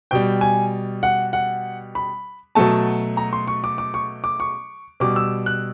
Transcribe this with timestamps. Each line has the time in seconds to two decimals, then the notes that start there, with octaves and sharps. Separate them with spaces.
0.11 B2 G3 G5
0.41 G#5
1.03 F#5
1.33 F#5
1.95 B5
2.55 B2 F#3 A3 A5
3.17 A#5
3.33 C6
3.48 C#6
3.64 D6
3.78 D6
3.94 C#6
4.24 D6
4.40 C#6
5.00 B2 G3 D6
5.16 E6
5.46 F#6